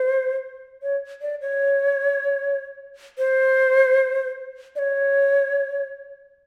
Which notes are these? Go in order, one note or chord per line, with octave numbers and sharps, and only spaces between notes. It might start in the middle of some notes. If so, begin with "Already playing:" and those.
Already playing: C5
C#5
D5
C#5
C5
D5
C#5